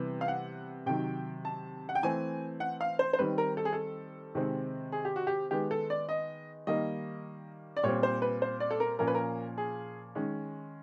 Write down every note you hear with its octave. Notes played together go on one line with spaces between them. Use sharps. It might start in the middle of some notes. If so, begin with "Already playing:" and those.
Already playing: C3 E3 G3 B3
F5
F#5
C3 D#3 F#3 G5
A5
F#5
G5
E3 A3 C4 G#5
F#5
F5
C5
C5
D#3 G3 C4 B4
A#4
A4
G#4
A4
C3 D#3 G#3 C4
G#4
G4
F#4
G4
D#3 G#3 B3 G4
A4
D5
D#5
D#3 G3 A#3 D#5
D5
A#2 G3 C4 C#5
C5
B4
C5
D5
A4
A#4
A#2 F3 A#3 C#4 A#4
B4
A#4
G#4
D#3 G#3 C#4